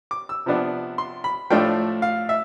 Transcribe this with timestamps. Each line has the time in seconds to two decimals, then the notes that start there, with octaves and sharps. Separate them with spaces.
0.11 D6
0.29 E6
0.46 C3 F3 B3 D4
0.98 C6
1.24 B5
1.50 A2 F3 A3 D4 F4 G5
2.02 F5
2.29 E5